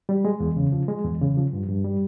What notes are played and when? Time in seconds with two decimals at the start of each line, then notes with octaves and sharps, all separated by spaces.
0.09 G3
0.25 G#3
0.40 E2
0.56 C#3
0.72 F3
0.88 G#3
1.05 E2
1.21 C#3
1.37 F3
1.53 G2
1.69 G2
1.85 G3